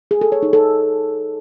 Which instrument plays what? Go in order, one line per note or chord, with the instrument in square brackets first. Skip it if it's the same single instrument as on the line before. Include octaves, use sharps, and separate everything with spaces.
[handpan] G#4
A4
C#5
D#4
A4